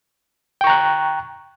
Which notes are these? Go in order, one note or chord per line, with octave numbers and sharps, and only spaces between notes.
G5 A#5 C#6 F#6